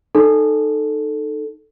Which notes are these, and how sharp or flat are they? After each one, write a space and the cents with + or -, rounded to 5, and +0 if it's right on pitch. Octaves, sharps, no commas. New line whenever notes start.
D#4 -20 A4 +0